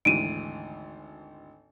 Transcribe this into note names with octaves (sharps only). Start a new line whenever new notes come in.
G#1 D2 E3 D7 D#7